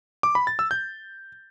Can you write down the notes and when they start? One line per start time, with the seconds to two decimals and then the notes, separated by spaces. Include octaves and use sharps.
0.23 D6
0.35 B5
0.47 A6
0.59 E6
0.71 G6